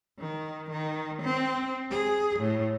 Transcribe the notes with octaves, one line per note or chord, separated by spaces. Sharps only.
D#3
D#3
C4
G#4
A2